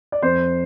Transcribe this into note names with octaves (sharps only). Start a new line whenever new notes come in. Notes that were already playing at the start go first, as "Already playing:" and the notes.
D5
F2 C5